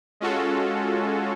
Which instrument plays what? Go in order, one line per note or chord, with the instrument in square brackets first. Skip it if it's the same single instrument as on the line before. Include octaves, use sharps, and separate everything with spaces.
[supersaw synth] G#3 C#4 F4 F#4 A4